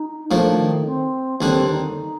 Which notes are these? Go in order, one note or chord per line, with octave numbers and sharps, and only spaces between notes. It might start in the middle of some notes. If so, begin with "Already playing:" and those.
Already playing: D#4
A2 F3 A#3 D4
D#3
C4
D#2 D3 G3 C4 D4
D#4